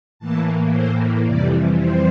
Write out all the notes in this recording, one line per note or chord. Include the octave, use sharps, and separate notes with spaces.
A2 E3 A#3 A5
C5
F2 C3 E3 G3 D5
C5